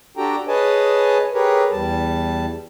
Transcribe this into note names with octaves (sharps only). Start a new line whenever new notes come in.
D4 F#4 G4 A4 G5 A#5
G#4 B4 C#5 D#5 G#5 A5
G4 G#4 A#4 B4 C#5
E2 G3 A5